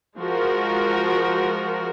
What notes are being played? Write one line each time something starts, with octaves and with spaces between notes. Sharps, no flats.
F3 G#3 F#4 A#4